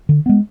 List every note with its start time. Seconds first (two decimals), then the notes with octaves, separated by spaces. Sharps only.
0.09 D3
0.26 G#3 B3